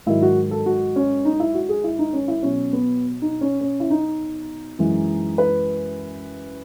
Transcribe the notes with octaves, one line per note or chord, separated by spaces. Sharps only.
G#2 D#3 F#3 E4
F#4
A4
F#4
C#4
D#4
E4
F#4
G#4
E4
D#4
C#4
E4
B2 F#3 C#4
B3
D#4
C#4
C#4
E4
D#4
F#2 E3 G#3
B4